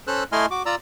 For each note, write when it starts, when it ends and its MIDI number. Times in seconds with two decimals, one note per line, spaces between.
0.07 0.24 61
0.07 0.24 69
0.07 0.24 72
0.07 0.24 88
0.07 0.24 90
0.32 0.46 57
0.32 0.46 64
0.32 0.46 75
0.32 0.46 80
0.32 0.46 84
0.32 0.46 89
0.51 0.63 66
0.51 0.63 86
0.66 0.75 65
0.66 0.75 74
0.66 0.75 82
0.66 0.75 88